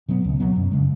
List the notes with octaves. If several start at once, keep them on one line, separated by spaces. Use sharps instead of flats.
B2 F#3 B3
C#2
B2 F#3 B3
F#2
C#3 G#3